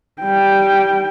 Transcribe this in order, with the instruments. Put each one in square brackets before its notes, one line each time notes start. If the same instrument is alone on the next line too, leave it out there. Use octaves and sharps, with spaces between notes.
[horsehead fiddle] G3 G5